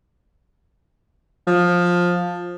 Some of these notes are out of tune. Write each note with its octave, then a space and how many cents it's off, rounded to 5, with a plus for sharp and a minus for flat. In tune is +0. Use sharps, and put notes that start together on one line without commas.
F3 +15